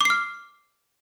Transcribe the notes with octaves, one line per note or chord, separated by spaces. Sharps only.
D6 F6 C7